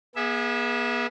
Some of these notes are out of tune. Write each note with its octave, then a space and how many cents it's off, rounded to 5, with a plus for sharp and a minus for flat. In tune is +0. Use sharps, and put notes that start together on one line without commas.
B3 -40 G#4 +0 E5 +0